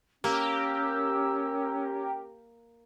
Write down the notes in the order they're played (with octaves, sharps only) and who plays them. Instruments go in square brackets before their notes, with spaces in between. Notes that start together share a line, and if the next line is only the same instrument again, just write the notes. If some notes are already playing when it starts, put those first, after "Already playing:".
[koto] A#3 [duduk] C#4 [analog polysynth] G4 A#4 [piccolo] E6